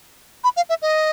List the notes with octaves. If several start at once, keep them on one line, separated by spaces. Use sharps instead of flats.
B5
F5
E5
D#5